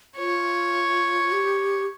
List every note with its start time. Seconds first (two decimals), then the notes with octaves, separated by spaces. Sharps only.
0.17 F4 C#5
1.32 G4